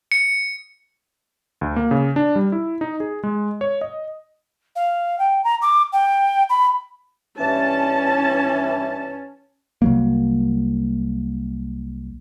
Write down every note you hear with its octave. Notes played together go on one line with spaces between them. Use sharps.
C#7
D2
A#3
C#3
D4
G3
E4
D#4
G#4
G#3
C#5
D#5
F5
G5
A#5
D6
G5
B5
G2 E3 C#4 A5
C2 F#3 A#3